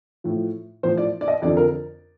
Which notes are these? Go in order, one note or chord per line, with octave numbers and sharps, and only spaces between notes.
A2 F3
A2 F3 C5
D5
D5
D#5
F2 D3 F3 D5
A#4